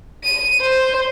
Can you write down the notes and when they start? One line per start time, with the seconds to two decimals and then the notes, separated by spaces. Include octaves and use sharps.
0.24 D#7
0.61 C5